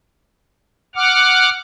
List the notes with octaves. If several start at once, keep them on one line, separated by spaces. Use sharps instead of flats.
F#5 D6 F6